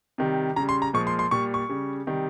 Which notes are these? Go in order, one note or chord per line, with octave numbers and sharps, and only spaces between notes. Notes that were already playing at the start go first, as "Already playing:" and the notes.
C3 D#3 G3
C#3 G3 A#5
C6
A#5
A#2 F3 G#3 C#6
C6
C6
A#2 G3 C#6
C#6
C#3 G3
C3 D#3 G3